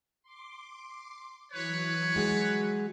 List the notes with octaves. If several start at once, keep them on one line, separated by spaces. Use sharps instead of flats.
C6 D6
E3 F#3 B4 C#5
G#3 F#4 G#4